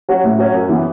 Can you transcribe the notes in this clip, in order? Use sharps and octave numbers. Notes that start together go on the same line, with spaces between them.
F#3 C#4 F#4
A2
F#3 C#4 F#4
F#2
E3 B3